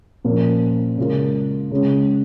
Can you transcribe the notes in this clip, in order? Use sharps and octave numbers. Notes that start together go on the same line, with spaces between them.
A#2 F3 C#4 A#4
C#3 G#3 F4 A#4
C#3 G#3 C#4